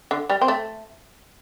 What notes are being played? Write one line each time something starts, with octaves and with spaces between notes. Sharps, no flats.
D3
G3
C4
A3